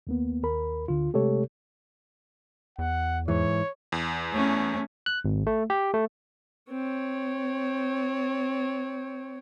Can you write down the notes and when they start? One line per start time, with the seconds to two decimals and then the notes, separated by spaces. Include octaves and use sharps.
0.07 D#2 A#3 B3
0.43 D#2 A#4 B5
0.88 D2 D3 F4
1.14 C3 G#3 A3 G4 A4 C#5
2.79 E2 F#5
3.28 G#2 E3 C#5
3.92 E2
4.33 A3 C#4
5.06 F#6
5.25 G#1
5.47 A3
5.70 G4
5.94 A3
6.70 C4 C#5